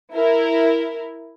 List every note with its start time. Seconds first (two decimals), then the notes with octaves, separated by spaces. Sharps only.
0.13 E4 A#4